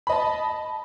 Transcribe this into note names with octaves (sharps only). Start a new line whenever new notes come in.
D#5 A5 B5